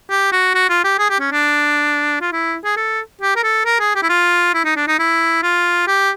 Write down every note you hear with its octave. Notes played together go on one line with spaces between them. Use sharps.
G4
F#4
F#4
F4
G4
G#4
G4
C#4
D4
F4
E4
G#4
A4
G4
A#4
A4
A#4
G#4
G4
E4
F4
E4
D#4
D4
D#4
E4
F4
G4